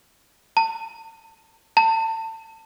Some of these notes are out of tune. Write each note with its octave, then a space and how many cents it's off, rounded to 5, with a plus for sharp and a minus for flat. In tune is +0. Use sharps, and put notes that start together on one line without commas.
A5 +40
A5 +30